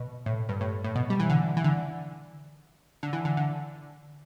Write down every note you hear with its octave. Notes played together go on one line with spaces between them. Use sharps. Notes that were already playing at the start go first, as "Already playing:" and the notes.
Already playing: B2
A2
G2
A2
A2
B2
G3
E3
D3
E3
D3
D3
E3
D3
D3